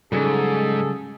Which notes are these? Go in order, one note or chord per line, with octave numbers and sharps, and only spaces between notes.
G#2 C#3 F#3 G3 G#4 A4